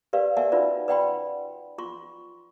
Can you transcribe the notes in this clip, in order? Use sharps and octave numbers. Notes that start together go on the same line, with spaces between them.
G4 A#4 B4 D5 F5
G4 A#4 D5 E5 F#5 G#5
C#4 D#4 F4 F#4 B4 D5
B4 D5 F#5 G5 B5 C6
F4 C6 C#6